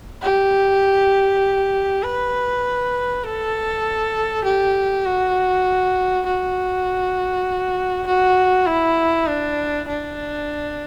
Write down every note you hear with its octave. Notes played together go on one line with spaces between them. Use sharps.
G4
B4
A4
G4
F#4
F#4
F#4
E4
D4
D4